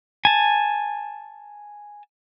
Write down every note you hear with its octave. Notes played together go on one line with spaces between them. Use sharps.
G#5 A5